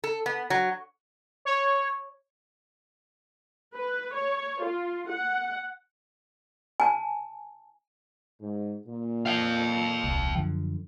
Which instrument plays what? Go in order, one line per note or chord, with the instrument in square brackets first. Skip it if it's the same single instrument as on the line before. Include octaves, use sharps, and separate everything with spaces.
[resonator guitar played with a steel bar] A4
B3
F#3
[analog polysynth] C#5
[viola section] B4
C#5
F4
F#5
[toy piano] G#5 A5
[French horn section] G#2
A#2
[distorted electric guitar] F5 G5
[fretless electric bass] D#1 C2
F#2 D3 F3